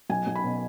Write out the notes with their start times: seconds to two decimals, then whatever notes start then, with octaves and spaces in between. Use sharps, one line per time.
0.10 B1 G#5
0.27 B1
0.36 B5
0.44 B2